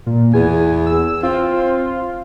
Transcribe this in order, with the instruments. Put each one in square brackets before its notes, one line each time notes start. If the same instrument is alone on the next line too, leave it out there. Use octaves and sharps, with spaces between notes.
[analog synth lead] A#2
[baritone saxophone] E2 [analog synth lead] G#5
[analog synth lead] E6
[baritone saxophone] C4 [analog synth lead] F4